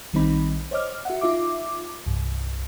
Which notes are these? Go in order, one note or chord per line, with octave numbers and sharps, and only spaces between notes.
A#1 D#3 G3 C4 D#4 B5
C5 C#5 D#5 D6 F6
F#4 E5 F#5
D#4 F4 E5 D6
C2 G2